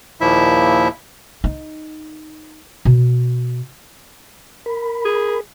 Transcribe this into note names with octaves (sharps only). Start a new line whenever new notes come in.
D#2 A#2 F3 E4 E5
D#4
B2
A#4 B5
G#4